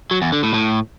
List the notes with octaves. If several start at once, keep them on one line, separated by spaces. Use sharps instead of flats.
F#3
E2
D3
A2
A2